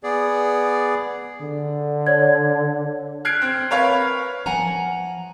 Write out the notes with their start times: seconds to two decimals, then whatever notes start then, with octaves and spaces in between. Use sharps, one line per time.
0.04 B3 G#4 D5
1.41 D3
2.07 C#5 D5 G#6
3.25 F6 F#6 G#6 C7 D7
3.41 C4
3.71 A#4 B4 C#5 F5
4.46 F3 F#5 G#5 A#5